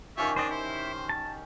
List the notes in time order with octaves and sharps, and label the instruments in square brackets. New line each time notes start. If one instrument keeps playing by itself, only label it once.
[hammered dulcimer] D#3 C#4 G4 [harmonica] F4 E5 C#6
[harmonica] D4 [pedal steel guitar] C5 D#5
[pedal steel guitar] E4 [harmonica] C5
[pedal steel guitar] A5